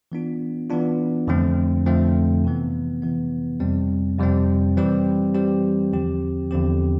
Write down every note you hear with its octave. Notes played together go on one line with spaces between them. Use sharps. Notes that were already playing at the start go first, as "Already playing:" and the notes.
E3 B3 D4 F4
E3 B3 D4 F4
F2 D3 F3 A3 C4
F2 D3 F3 A3 C4
C3 E3 B3
C3 E3 B3
F2 C3 G3 C4
F2 C3 G3 C4
E3 G3 C4 G4
E3 G3 C4 G4
E2 D3 F3 C4 G4
E2 D3 F3 C4 G4